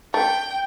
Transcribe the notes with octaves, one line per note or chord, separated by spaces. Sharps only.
A3 G5